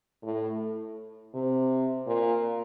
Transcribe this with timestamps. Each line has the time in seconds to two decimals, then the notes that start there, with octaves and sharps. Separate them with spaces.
0.23 A2
1.34 C3
2.06 A#2